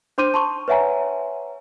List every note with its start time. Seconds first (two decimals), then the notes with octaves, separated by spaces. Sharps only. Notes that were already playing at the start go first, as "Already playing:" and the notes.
0.18 D4 C5 C6 D6 G6 D#7
0.34 A5 C6 C#6
0.68 B4 C#5 E5 F#5 G#5 A#5